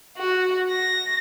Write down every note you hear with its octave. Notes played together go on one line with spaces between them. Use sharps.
F#4
A#6